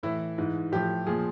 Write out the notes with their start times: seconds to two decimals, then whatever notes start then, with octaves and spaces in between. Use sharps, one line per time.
0.03 A2 E3 E4
0.38 G#2 E3
0.72 A2 F3 G4
1.07 A#2 F3 G#4